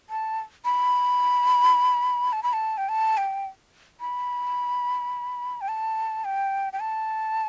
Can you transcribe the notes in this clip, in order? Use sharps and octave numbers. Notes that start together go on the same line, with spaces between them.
A5
B5
A5
B5
A5
G5
A5
G5
B5
G5
A5
G5
G5
A5